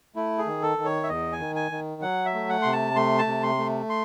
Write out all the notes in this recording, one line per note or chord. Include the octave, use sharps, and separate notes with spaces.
A3 E4
G#4
D#3
A4
D#3
C#5
E5
E2 D#5
G#5
D#3
G#5
D#3
F#3 F#5
E5
A3
F#5
C3 C6
A5
A3 C6
A5
C3
C6
A3
C6